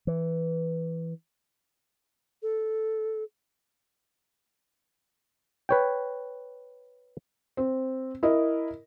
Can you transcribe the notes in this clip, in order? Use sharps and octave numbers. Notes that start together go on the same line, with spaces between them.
E3
A4
B4 C#5 G5
C4
E4 A#4 D#5